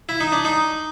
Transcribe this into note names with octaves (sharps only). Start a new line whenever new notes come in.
E4
D#4
D4
D#4